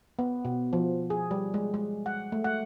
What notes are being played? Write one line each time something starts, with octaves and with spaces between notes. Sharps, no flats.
B3
B2
F3
G#4
G3
G#3
G#3
F#5
A3
F#5